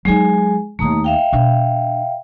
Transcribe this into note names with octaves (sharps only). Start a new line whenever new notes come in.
F#3 G#3 D#4 G#4 G#5
E1 D#2 A3 A#5 D#6
E5 F5 G5
B2 D4